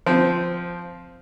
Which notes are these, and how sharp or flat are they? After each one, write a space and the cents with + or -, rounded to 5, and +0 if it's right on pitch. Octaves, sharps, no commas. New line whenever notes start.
F3 +0 C4 -10